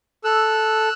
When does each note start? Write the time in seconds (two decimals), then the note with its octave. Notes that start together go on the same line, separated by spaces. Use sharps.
0.24 A4 E6 F#6